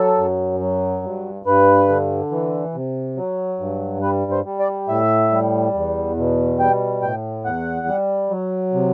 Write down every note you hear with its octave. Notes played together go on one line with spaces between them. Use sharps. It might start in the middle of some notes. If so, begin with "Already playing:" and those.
Already playing: F#3 A4
F#2
F#3
G2
G2 B4
D3
E3
C3
F#3
G2
G3 B4
C5
G3
D5
A2 E5
G3
E2
B2
G3 G5
A2 G5
E2 F#5
G3
F#3
C3